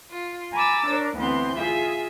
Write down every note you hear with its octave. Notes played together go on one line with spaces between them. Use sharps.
F4
G#5 A#5 B5 D6 E6 A6
D4 A#4 C#5
D2 E3 B3 C4 C6 G6
F4 G#4 E5